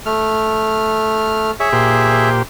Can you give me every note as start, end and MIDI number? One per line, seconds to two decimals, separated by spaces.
0.06 1.51 57
0.06 1.51 89
1.60 2.29 68
1.60 1.69 73
1.60 2.29 76
1.73 2.42 46
1.73 2.42 67
1.73 2.42 72